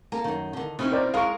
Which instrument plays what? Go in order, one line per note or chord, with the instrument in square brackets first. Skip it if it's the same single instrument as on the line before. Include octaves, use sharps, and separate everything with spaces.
[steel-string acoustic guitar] A#3 A4 [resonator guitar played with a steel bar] A#5
[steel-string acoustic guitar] F#2 D#3
D3 D#3
[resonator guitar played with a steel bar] B2 C#4 D#4 [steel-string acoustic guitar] C4 E4
[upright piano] A#4 C5 D5
[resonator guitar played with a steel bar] G#3 A#4 [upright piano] F5 C#6